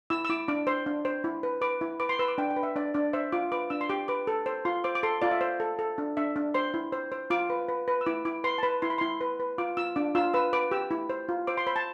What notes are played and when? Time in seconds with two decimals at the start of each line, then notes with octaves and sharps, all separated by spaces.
0.10 E4 E6
0.25 E6
0.29 E4 D6
0.48 D4 D6
0.67 C5 C6
0.86 D4
1.05 C5
1.24 E4
1.43 B4
1.61 B4 D6
1.81 E4
2.00 B4 D6
2.09 C6
2.19 B4 E6
2.28 D6
2.38 D4 G5
2.50 G5
2.56 B4
2.63 E5
2.76 D4 D5
2.94 D4 D5
3.13 C5 E5
3.32 F4 D6
3.52 B4 D6
3.70 D4 E6
3.81 C6
3.89 G4 D6
4.08 B4 D6
4.27 A4
4.46 C5
4.65 F4 C6
4.84 C5 D6
4.95 D6
5.03 A4 C6
5.22 F4 D5
5.31 E5
5.41 C5
5.60 A4
5.79 A4
5.98 D4
6.17 D4 E5
6.36 D4
6.54 C5 C6
6.74 E4
6.93 C5
7.12 C5
7.30 F4 D6
7.50 B4
7.68 B4
7.88 B4
8.01 E6
8.06 E4 D6
8.25 E4 D6
8.44 B4 C6
8.58 A5
8.63 B4 B5
8.82 E4 C6
8.90 B5
8.98 E4 C6
9.21 B4
9.40 B4
9.58 F4 D6
9.77 F4 E6
9.96 D4 D6
10.15 F4 E6
10.34 B4 E6
10.53 B4 D6
10.71 G4 E6
10.91 E4
11.10 C5
11.29 F4
11.47 C5 D6
11.57 C6
11.67 C5 B5
11.76 A5